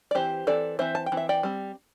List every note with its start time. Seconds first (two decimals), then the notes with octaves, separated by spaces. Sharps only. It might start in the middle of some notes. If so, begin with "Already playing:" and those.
0.11 D5
0.15 E3 C4 G4 C5
0.47 E3 C4 A4 D5
0.79 E3 C4 C5 E5
0.95 A5
1.06 G5
1.12 E3 C4
1.17 E5
1.29 D5 G5
1.43 G3 C4